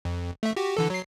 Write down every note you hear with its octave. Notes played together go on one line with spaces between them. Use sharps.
F2
A3 E5
F#4 G4
D3 E3 A4
F#3 C7